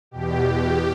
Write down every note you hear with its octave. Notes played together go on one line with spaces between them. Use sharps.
E2 B2 G4